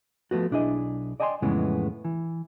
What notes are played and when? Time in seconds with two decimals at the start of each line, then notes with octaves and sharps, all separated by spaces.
0.31 F3 A3 B3 F#4
0.51 B1 D4 E4 G#4 D#5
1.20 D5 D#5 G5 G#5 A#5 C6
1.42 F2 A2 C#3 E3 G#3 B3
2.05 E3